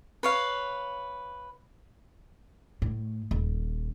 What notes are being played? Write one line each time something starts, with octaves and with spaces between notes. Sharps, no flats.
B4 C#5 F5
A2
D#1